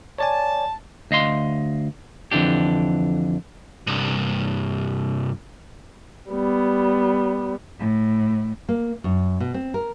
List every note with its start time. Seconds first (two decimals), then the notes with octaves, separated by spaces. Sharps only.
0.19 C#5 D5 G#5 A5
1.11 D2 D#5 F5 C6
2.31 F2 D3 E3 D4 G4
3.87 C2 G2
6.30 G3 B3
7.80 A2
8.69 A#3
9.04 F#2
9.40 B2
9.54 C4
9.74 A#4